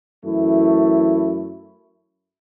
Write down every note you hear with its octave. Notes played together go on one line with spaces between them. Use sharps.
F#2 E3 A3 E4